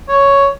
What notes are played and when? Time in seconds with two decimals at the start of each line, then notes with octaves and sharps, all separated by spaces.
0.09 C#5